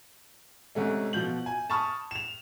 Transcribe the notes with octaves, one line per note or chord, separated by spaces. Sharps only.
G#2 C3 A3 C#4
B2 F3 G6 F#7
G#5
A5 B5 C#6 D#6 F6
E7 F7